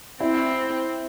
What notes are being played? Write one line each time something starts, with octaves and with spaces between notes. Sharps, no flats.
C4 E4